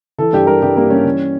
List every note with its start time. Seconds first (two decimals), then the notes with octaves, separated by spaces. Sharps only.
0.18 E3 A4
0.33 G2 G4
0.47 G3 A#4
0.62 G2 G4
0.77 G3 A#3
0.90 G3 C#4
1.05 E3